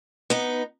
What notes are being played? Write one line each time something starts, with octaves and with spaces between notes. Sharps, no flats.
B3 D#4